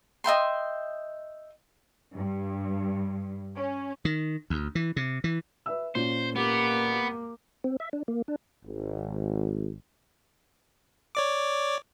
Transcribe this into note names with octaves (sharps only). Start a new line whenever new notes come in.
D#5 E5 G5 C6
G2
C#4
D#3
D2
E3
C3
E3
B4 E5 E6
A#2 C#4 C5
A#3 B3 G4
C4
E5
D4
A#3
D4
G#1
C#5 D5 D6